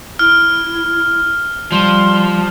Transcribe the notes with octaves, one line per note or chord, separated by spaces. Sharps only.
E4 F6
F3 G3 C6